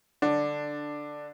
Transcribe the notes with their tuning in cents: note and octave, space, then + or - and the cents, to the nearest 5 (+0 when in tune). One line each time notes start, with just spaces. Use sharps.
D3 +0 D4 +10